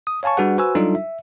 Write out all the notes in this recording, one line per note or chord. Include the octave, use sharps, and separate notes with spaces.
D#6
C#5 F5 G#5 A5 C#6
G3 D4 F#4 G#4 B4 F#5
F#4 B4 C5 G#5 E6
F#3 G3 D4 D#4 F4 A4
E5